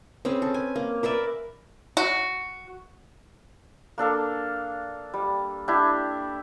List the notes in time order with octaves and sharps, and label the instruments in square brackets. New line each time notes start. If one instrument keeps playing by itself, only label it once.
[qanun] C4 C#4 G#4 B4
A4
G#5
A#3
A#4 B4 D5 E5
[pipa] F#4
[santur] A#3 D4 A4 F5
G3
D4 E4 G4